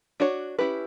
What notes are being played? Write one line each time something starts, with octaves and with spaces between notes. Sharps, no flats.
D4 F#4 C#5
C#4 E4 G4 B4